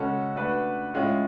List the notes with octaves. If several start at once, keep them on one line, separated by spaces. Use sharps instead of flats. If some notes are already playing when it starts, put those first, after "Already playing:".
Already playing: C#3 G#3 C#4 F#4 A4
A3 D4 F#4 B4
A2 G#3 C#4 F4